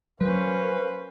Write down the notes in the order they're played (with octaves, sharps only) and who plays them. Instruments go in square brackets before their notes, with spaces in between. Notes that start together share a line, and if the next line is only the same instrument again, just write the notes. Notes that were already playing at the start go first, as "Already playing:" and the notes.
[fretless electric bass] F#3 [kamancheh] A#3 C#4 [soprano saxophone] B4 [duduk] C5